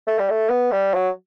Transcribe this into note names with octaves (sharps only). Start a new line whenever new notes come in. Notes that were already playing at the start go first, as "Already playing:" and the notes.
A3
G3
A3
B3
G3
F#3